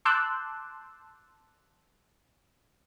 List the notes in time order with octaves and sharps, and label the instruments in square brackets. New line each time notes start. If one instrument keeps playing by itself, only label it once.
[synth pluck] A5 C6 D6 E6 F#6 G6